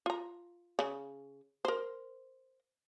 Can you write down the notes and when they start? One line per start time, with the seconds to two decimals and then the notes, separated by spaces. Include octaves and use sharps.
0.06 F4 A#5
0.79 C#3
1.65 A#4 C5